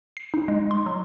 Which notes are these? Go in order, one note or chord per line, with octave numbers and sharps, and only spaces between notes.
C7
D#4
G#3
C6
F#3